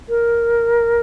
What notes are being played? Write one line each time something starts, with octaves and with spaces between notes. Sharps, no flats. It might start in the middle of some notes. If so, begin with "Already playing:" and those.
A#4